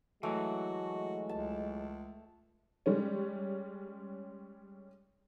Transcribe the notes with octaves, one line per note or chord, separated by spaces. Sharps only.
E3 F#3 G#3 A3 F#4
C#2 A5
G3 G#3 C#4